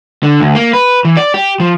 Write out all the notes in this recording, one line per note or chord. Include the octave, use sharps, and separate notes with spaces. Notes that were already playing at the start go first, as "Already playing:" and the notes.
D3
D2
A#3
B4
E3
D5
G4
F3